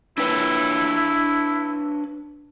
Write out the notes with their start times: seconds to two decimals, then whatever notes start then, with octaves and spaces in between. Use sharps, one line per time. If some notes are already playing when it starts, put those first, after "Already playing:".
0.18 D4 E4 B4 C#5